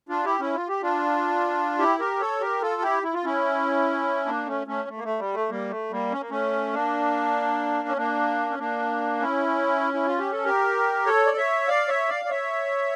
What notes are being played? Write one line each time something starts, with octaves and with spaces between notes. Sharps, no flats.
D4 F4
E4 G4
C#4 E4
F4
G4
D4 F4
E4 G4
G4 A#4
A4 C#5
G4 A#4
F4 A4
E4 G4
E4
F4
C#4 E4
A#3 D4
A3 C#4
A3 C#4
A3
A#3
A3
G3
A3
G3 A#3
A3
G3 A#3
C#4
A#3
A3 C#4
A#3 D4
C#4
A#3 D4
C#4
A#3 D4
C#4 E4
E4
F4
G4
A4
G4 A#4
A4 C#5
D5
C#5 E5
D5 F5
C#5 E5
D5 F5
D5
C#5 E5